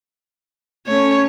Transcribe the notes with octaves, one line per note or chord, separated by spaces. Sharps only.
A3 C#4 C#5